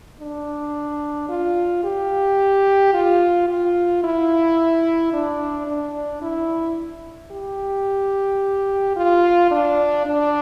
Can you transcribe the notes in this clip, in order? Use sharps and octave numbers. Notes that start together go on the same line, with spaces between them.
D4
F4
G4
F4
F4
E4
D4
D4
E4
G4
F4
D4
D4